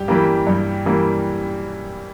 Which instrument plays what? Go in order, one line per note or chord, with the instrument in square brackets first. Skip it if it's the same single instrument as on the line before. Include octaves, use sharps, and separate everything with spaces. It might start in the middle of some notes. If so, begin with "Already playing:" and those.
Already playing: [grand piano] G2 G4
E3 G3 A#3
G2
E3 G3 A#3